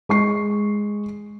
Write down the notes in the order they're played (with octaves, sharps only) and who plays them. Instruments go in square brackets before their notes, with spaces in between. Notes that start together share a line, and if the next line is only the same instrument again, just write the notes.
[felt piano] G#3 C#6 C7